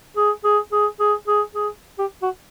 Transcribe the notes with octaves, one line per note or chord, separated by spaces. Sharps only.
G#4
G#4
G#4
G#4
G#4
G#4
G4
F#4